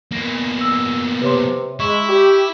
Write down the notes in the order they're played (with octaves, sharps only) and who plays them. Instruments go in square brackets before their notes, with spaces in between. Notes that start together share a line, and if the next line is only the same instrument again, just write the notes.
[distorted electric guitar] B2 A#3
[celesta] E6 A#6
[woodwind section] C3 [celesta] B4 C#5 C6
[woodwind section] G#3 [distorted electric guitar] E4 [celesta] C#6
[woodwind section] G4